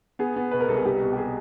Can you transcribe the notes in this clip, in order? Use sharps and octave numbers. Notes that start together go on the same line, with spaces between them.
B3 G#4
B3
B2 B4
A#4
C2 A4
G#4
G3 G4
B2
G4
B2 G#4